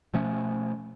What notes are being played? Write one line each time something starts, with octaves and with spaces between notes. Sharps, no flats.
B2 F3 A3 C#4